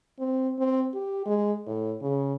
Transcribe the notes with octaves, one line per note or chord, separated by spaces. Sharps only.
C4
C4
G4
G#3
A2
C#3